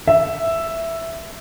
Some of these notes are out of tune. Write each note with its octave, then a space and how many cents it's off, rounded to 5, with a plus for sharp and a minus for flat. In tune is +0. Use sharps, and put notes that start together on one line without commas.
E5 +5